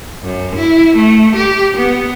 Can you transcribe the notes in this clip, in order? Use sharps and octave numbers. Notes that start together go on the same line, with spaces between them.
F#2
E4
A3
G4
B3